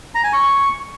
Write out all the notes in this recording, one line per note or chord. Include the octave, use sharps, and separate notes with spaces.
A#5
G#5
C#6